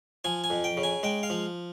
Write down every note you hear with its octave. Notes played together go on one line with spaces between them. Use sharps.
F3 G#5
G#5
F2
G5
C#3
G#5
G#3 G5
F5
F3